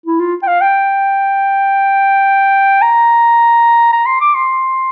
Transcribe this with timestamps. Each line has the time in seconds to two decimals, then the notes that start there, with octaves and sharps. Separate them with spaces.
0.06 E4
0.20 F4
0.43 G5
0.48 F5
0.61 G5
2.82 A#5
3.93 A#5
4.06 C6
4.21 D6
4.34 C6